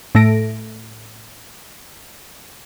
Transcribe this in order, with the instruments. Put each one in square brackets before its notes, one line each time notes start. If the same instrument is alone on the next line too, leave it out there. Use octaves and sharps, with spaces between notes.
[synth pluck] A2 A3 A#6 D7